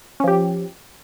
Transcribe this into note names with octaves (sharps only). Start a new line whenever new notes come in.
F3 C#4 G4